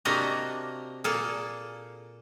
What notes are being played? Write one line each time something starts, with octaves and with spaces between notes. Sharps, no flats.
C3 A#3 D4 F#4 D#5 A#5
A#2 A#3 G#4 A4